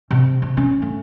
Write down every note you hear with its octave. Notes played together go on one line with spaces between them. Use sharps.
C3
C3
C#4
A3